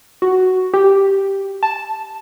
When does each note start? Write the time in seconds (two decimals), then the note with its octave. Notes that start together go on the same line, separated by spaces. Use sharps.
0.22 F#4
0.74 G4
1.63 A5